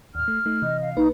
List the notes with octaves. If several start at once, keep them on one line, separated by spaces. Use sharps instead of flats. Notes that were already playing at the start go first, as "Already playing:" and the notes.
D#2 A2 F6
A3
A3 D#4
C3 E3 D#5
F5
B1 A#3 D#4 B4